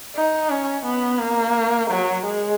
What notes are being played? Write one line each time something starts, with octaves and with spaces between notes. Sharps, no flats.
D#4
C#4
B3
A#3
F#3
G#3